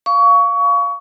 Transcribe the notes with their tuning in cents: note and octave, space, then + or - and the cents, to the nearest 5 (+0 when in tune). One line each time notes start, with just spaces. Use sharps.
F5 +0 C#6 +25